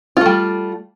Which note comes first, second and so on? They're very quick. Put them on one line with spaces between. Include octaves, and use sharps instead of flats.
F4 A3 G3